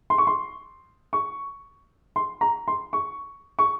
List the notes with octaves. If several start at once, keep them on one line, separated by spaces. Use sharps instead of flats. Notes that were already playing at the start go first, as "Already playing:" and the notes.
C6
C#6
C6
C#6
C6
A#5
C6
C#6
C#6